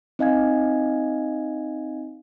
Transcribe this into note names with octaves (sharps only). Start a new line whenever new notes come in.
C4 D#4 D#5 F5 G#5 G#6